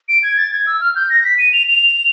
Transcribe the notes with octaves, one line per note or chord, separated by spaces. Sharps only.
D7
G#6
A6
G#6
E6
F6
G6
A#6
B6
D#7
F7
F7